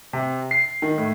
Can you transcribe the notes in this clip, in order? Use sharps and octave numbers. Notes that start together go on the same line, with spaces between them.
C3
C7
D#3
A2